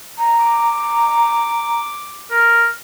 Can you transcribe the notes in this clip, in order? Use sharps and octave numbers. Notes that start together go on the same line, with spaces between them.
A#5
D6
A#4